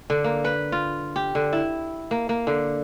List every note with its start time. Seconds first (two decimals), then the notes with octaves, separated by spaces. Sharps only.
0.10 D3
0.24 A#3
0.45 B4
0.72 F4
1.16 G4
1.35 D3
1.53 E4
2.11 A#3
2.29 A#3
2.47 D3